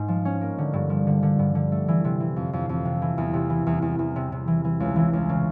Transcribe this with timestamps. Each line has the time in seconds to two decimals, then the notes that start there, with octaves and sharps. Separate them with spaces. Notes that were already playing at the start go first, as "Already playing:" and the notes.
Already playing: G#2
0.08 F3
0.25 C#4
0.41 A#3
0.58 D3
0.73 G2
0.90 F3
1.07 D3
1.23 D3
1.39 G2
1.55 D3
1.72 A3
1.88 E3
2.05 C3
2.20 E3
2.36 F2
2.53 F2
2.69 F2
2.85 C3
3.02 E3
3.18 E2
3.34 C3
3.50 E3
3.67 E2
3.82 E2
3.99 E2
4.16 C3
4.32 C3
4.48 E3
4.64 E3
4.80 C#2
4.96 E3
5.13 C#2
5.29 C#3